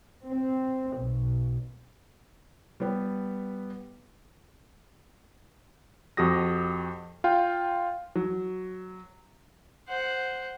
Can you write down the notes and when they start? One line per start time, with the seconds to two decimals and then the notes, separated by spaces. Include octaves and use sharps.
0.23 C4
0.97 B1
2.80 G3 B3
6.17 F2 F#4 G4 D#6 A#6
7.24 F4 F5 G5
8.16 F#3
9.88 C5 F#5